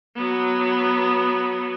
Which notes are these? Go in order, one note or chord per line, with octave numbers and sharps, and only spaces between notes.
F#3 B3